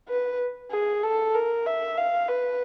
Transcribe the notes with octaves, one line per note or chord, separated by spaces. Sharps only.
B4
G#4
A4
A#4
E5
F5
B4